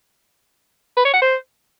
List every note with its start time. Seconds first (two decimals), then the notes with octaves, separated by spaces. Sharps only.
0.97 B4
1.05 C#5
1.13 F#5
1.22 C5